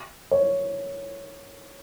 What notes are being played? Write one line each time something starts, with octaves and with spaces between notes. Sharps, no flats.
C#5